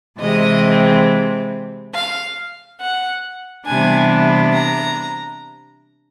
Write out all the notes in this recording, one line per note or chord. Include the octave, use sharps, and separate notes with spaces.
C3 E3 G#3 C4 D#5
F5
F#5
C3 E3 G3 B3 D4 G#5
A#5